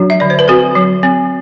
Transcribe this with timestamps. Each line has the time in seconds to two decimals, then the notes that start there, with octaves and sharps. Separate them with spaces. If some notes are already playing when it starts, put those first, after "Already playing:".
Already playing: F#3 D4 F#4
0.10 E5
0.20 D3 D5
0.30 C5
0.39 B4
0.48 C4 F#4 A4
0.75 F#3
1.03 C4